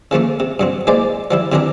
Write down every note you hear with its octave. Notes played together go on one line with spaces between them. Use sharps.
C#3 F3 A3 A#3
C3
G2 F#3 C4
E3 G#3 A#3 C5 D5
F3 G3 E4
C3 E3 F#3 C4 D4 A#4